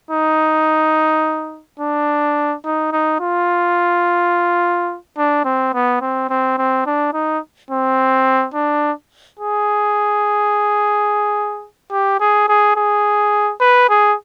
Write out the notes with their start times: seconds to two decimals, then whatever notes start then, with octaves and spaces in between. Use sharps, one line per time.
0.11 D#4
1.79 D4
2.65 D#4
2.92 D#4
3.20 F4
5.18 D4
5.45 C4
5.74 B3
6.01 C4
6.30 C4
6.58 C4
6.86 D4
7.13 D#4
7.71 C4
8.54 D4
9.39 G#4
11.91 G4
12.20 G#4
12.48 G#4
12.76 G#4
13.60 B4
13.89 G#4